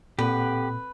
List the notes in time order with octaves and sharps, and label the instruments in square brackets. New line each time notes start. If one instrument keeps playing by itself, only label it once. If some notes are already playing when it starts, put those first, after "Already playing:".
[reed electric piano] A#2 [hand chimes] C4 A4 [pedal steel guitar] G4 F#5 [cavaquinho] B4